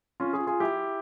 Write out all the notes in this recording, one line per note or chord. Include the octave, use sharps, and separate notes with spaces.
C#4 F4
F4 G#4
F4 G#4
E4 G4